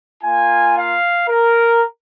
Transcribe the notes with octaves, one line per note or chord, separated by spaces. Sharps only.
A#3 F4 G#5
F5
A#4